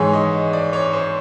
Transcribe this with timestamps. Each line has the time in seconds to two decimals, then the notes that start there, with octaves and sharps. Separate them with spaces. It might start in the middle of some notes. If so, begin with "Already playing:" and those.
Already playing: G#2 E3 G#3 C#5
0.13 D#5
0.53 D5
0.73 C#5
0.93 C5